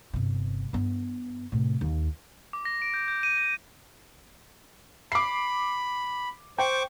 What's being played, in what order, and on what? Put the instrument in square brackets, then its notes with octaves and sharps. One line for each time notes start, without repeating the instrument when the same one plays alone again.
[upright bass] G1 C3
G2 B3
A2 C3
D#2
[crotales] D6
A#6
D7
G6
G6
D#7
A#6
[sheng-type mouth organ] B5 [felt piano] D6 C7
[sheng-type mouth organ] C5 C#6 D6 [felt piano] G5